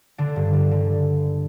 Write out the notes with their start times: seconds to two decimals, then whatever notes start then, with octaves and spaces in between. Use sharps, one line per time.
0.18 D3 D4
0.36 G2
0.53 D3
0.71 D3